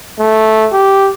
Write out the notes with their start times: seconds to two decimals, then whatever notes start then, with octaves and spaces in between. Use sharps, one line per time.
0.19 A3
0.73 G4